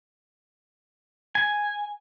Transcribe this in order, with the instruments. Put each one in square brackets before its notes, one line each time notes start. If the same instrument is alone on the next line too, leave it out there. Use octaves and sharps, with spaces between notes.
[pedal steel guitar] G#5